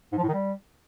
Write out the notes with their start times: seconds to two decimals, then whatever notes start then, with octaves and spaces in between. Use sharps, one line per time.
0.12 G#2
0.18 F3
0.23 A2
0.28 D#3
0.34 G3